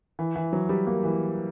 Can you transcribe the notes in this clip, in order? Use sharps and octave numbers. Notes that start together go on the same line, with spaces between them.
E3
E3
F#3
G3
A#3
E3